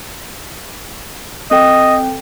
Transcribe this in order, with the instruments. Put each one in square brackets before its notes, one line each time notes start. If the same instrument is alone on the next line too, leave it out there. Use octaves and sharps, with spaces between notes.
[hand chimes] C4 A4 G5 [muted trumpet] D#5